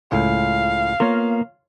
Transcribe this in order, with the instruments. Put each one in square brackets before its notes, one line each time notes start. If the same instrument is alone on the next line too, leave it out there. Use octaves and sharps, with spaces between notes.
[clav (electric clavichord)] C#2 A2 [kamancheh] F5
[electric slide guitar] A#3 B3 A#4 [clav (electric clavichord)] F4 C#5